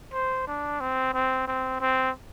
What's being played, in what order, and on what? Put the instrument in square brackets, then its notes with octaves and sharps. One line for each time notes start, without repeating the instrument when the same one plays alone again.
[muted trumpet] C5
D4
C4
C4
C4
C4